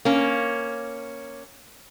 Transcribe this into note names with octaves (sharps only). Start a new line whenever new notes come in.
A#3 C#4